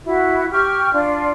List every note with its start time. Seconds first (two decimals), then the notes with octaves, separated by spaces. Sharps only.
0.05 E4 F#4
0.51 G4 G5 C#6 F6
0.93 D4 F4 D5